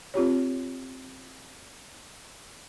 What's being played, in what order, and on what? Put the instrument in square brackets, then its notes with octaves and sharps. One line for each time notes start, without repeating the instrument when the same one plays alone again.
[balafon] C4 F4 G4 C#5